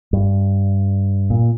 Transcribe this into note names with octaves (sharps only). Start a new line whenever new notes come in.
G2
A#2